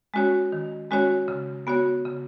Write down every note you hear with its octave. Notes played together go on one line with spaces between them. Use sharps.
G#3 C#4 F#4 C#5
D#3
G#3 C#4 F#4 C#5
C#3
B3 F#4 C#5
C#3